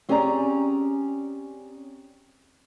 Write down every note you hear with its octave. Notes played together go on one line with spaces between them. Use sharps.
C4 C#4 G4 G#4 D5 A#5